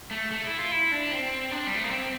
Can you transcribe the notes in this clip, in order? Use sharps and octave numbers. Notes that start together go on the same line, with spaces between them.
A3
A3
E4
F4
E4
D4
C4
D4
G3
A3
A#3
C4